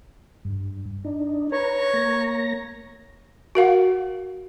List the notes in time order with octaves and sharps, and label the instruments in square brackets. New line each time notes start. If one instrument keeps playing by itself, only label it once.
[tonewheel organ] G2
D4 D#4
[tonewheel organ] B4 A#5 [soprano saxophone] C#5
[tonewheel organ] A#3 A#5 A#6
[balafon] F#4 A#4 F5 F#5